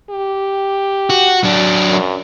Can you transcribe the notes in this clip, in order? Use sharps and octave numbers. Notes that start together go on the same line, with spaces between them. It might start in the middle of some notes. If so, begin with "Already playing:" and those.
G4
F#4
F#3 D4
F#2